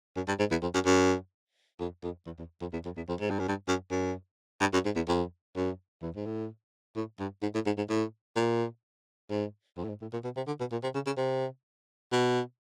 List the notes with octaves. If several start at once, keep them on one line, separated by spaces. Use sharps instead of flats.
F#2
G2
G#2
E2
F2
F#2
F#2
F2
F2
E2
E2
F2
E2
F2
E2
F2
G#2
G2
F#2
G2
F#2
F#2
G2
F#2
G#2
E2
F2
F#2
E2
G#2
A2
A2
G2
G#2
A2
G#2
G#2
A2
A#2
G#2
F2
A2
G#2
A2
A#2
B2
C3
D3
B2
A#2
C3
C#3
C#3
C3
B2